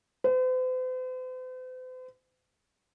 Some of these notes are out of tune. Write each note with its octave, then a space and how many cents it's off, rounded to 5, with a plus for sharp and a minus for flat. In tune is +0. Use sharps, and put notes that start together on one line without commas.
C5 -45